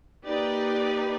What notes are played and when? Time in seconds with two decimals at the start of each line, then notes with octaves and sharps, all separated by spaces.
0.25 A#3 D#4 G4 B4 D5